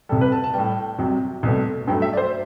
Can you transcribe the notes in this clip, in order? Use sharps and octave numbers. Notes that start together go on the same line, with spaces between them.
C2 C3 G3 A4
B4
A5
A5
A2 G3 G5
C2 C3 F#3
C2 B2 A3
G2 F#3 A3 G5
E5
D5
C5